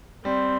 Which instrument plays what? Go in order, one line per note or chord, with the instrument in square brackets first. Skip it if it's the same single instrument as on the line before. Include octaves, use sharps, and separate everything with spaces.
[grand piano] G3 [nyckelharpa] C4